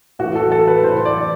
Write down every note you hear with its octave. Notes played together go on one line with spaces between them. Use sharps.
A2 E3 F#4
A4
A4
B4
A2 E3 C5
D5